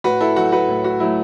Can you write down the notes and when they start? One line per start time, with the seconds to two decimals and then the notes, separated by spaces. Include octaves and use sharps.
0.04 A2 F#4 B4
0.20 E4 A4
0.36 F#3 A3 F#4
0.52 F#4 B4
0.68 A2
0.84 F#4
1.00 F#3 A3 E4